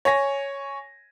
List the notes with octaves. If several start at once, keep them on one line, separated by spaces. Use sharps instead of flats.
C#5 G#5 A#6